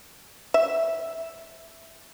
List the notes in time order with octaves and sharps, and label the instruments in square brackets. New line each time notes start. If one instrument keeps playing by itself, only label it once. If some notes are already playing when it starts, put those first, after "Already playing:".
[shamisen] E5